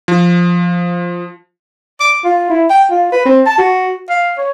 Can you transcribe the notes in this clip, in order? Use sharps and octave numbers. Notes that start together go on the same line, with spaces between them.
F3
D6
F4
E4
G5
F4
B4
C4
A5
F#4
F5
C#5